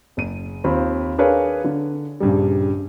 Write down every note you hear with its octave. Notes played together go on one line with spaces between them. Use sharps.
F#1 D#7
D#2 C4 F4 B5
D4 G#4 A#4 B4 C#5 F5
D3
A#1 G2 C#3 G3